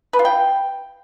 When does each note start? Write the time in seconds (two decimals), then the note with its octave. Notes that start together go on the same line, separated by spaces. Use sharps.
0.13 B4
0.19 F4
0.25 G5